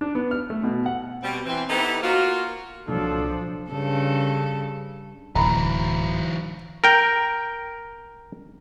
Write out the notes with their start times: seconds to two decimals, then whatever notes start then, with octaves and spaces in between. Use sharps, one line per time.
0.01 D4
0.15 B3
0.31 F6
0.50 A3
0.63 B2
0.86 F#5
1.23 B2 G3 C4
1.46 E3 C4
1.68 B3 D#4 E4 G4 A4 C5
2.03 A#3 F4 F#4
2.88 C2 A#2 F3 F#3 D4 A4
3.71 G2 C#3 A4
5.35 D1 E3 F#3 A#5 B5
6.84 A#4 G5